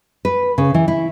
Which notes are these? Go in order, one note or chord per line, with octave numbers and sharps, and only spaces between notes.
B4
C#3
E3
E4